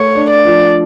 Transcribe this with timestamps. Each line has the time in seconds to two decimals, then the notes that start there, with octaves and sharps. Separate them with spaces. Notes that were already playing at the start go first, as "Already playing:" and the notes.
Already playing: A3 C#5
0.15 D4
0.30 D5
0.45 F3